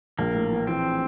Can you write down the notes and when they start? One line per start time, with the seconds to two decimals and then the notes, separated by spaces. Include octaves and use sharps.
0.18 A#1 A#3
0.34 A2
0.51 E3
0.67 E3 C4